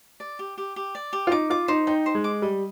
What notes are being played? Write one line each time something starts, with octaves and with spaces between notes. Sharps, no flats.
D5
G4
G4
G4
D5
G4
F4
D#4 D6
F4 D6
D#4 C5
D#4 G5
C5
G#3
D6
G3 D#5